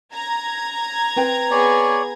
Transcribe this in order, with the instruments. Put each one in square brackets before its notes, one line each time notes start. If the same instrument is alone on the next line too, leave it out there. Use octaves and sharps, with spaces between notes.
[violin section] A#5 G#6
[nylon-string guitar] C4 B4 G5
[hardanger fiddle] B3 G#4 [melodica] C#5 D5